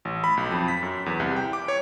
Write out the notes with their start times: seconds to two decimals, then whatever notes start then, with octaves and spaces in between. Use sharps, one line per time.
0.05 A1
0.24 B5
0.37 B1
0.51 F2
0.68 B6
0.83 F#2
1.06 E2
1.20 C2
1.36 G5
1.53 D6
1.68 C#5